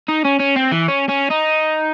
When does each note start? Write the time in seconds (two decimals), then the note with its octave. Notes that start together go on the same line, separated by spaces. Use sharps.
0.09 D#4
0.25 C#4
0.40 C#4
0.56 C4
0.72 E3
0.88 C#4
1.09 C#4
1.30 D#4